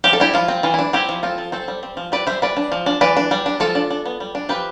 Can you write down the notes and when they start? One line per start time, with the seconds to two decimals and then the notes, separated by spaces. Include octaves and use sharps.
0.04 F3 G4
0.13 A4
0.20 D4 E4 G4
0.34 F3 F4
0.48 C4
0.63 E3 F4
0.74 E4
0.79 D4
0.93 C4 E4 G4
1.09 F3
1.23 C4 F4 A4
1.38 F3
1.52 C4 A4 C5
1.68 G3
1.83 C4
1.97 F3
2.12 C4 B4 D5
2.27 G3 C5 E5
2.42 G3 B4 D5
2.57 D4
2.72 F3
2.86 D4
3.01 E3 B4 D5
3.17 D4
3.31 G3
3.46 D4
3.60 F3 F4 A4
3.75 D4
3.90 D4
4.06 B3
4.20 G3
4.35 D4
4.49 F3 G4 B4